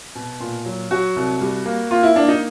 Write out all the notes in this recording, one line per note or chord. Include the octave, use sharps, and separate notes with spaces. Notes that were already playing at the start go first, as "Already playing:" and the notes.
B2
A#2
F#3
F#3 F#4
C2
G3
A#3
A#3 F4
E4
A#3 D4
D#4